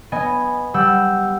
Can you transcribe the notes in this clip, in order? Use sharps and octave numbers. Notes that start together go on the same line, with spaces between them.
B3 D#5 G#5
G3 F#5 E6 G6